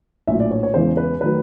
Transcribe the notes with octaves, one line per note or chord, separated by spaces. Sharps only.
A#1 A2 F#3 E5
D5
C#5
C#5
E2 C#3 E3 G#3 C5
B4
D#3 F#3 A3 B4